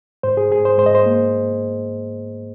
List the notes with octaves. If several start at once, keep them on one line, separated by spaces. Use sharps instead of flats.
G#2 C5
G#4
G#2 G#4
C5
G#2 C5
D#5
C5
A#3